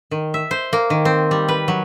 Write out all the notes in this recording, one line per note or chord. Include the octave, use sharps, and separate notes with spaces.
D#3
E5
C5
A#3
D#3
C4
G3
B4
F#3